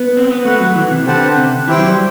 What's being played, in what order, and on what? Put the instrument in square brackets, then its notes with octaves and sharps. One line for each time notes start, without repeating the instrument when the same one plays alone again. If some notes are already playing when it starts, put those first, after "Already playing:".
Already playing: [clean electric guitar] B3
C4
B3
[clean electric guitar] A3 [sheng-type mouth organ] F#4 B4 F#5
[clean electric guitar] F#3
E3
C3
[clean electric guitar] D3 [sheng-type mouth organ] C4 G4 B4 F#5 A5
[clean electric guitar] C3
[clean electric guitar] E3 [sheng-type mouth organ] E4 G4 C5 G5
[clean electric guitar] F#3
G3